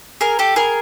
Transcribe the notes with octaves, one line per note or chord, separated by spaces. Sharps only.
G#4 A#4
G4 A4
G#4 A#4